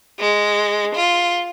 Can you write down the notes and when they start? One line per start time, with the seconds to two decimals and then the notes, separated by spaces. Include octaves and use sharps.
0.18 G#3
0.94 F4